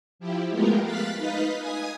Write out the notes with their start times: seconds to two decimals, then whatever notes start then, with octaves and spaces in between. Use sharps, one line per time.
0.19 F3 E4 G4
0.50 G#3 A3 B3 F4 G4 A#4
0.83 F5 F#6 A6 B6
1.17 D#4 B4 D#5 F5 B6
1.59 G#5 D#6 G#6